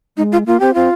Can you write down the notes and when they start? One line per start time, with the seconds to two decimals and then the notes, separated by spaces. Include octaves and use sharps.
0.17 G#3 D#4
0.32 F4
0.46 A#3 F4
0.60 C4 G4
0.74 C4 F4